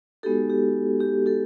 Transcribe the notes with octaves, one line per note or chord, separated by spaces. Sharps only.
G#3 B3 D#4 F#4 G4 A4
G4
G4
G4 A4